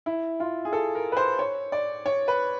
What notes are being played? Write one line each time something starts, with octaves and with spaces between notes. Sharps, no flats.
E4
F4
G#4
A4
A#4
B4
C5
C#5
D5
C#5
B4